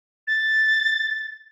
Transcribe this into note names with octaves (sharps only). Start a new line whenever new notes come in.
A6